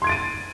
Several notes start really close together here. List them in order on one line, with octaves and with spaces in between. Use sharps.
C6 G#6 D7 A6 D#7